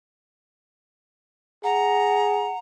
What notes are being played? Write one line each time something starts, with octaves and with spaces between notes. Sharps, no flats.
G#4 F#5 A#5